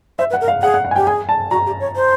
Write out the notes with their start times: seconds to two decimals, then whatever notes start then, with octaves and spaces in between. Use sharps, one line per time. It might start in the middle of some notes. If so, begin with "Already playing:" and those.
0.19 C5 E5
0.30 B4
0.33 F#5
0.41 A#4
0.48 F5
0.62 G#4 F#5
0.74 F#5
0.85 F#5
0.91 G#5
0.96 G4 G5
1.07 G#4 G#5
1.29 A5
1.51 F#4 A#5
1.66 G4
1.80 C#5
1.96 C5